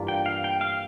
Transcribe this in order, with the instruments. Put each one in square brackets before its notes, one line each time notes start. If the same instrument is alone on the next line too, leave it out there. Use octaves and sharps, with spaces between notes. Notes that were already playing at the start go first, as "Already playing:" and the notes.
Already playing: [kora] G2 E3 A#3 F4
[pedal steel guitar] G5
F5
G5
F5